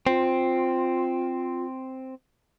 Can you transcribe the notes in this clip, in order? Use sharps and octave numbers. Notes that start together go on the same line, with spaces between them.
C4 F4